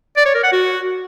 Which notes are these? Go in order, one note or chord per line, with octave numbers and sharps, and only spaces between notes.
D5
C#5
A#4
F#5
F#4